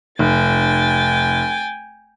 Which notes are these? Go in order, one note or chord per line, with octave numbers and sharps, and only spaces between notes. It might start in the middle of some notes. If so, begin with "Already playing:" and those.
F1 G5 G#5 A6